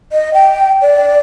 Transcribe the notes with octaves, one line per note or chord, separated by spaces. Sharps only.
D#5
G5
D5